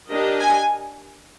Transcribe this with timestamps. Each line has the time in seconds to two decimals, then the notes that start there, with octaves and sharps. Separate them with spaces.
0.10 D4 G4 A#4 D#5
0.39 G#5